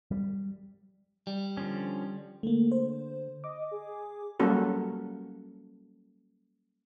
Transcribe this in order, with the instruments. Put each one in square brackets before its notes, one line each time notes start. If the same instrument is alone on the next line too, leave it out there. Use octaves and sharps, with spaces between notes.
[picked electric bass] G3
[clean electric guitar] G3
[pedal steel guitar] D3 F3 C#4
[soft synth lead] D3 [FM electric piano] A3 A#3
[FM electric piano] C5
[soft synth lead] D#5 [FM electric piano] D6
[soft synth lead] G#4
[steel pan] F#3 G3 A#3 C#4 F#4 A4